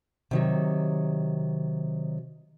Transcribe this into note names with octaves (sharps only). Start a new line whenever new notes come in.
C3 D#3 F#3